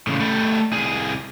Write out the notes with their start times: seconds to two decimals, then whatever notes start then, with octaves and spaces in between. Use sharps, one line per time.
0.07 A2 C#3
0.20 G3 A3
0.73 C2 G#4